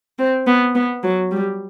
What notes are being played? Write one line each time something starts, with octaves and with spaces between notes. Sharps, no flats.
C4
B3
B3
F#3
G3